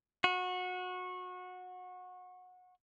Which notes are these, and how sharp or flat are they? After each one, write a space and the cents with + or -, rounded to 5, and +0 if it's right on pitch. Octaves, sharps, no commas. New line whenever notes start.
F#4 -25